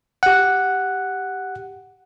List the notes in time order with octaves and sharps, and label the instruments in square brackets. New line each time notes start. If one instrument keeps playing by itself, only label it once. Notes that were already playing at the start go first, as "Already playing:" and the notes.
[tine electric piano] G4 F#5